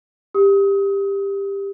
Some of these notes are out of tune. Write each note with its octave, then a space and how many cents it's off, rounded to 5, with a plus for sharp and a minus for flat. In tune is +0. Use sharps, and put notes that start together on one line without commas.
G4 +15 D#6 +30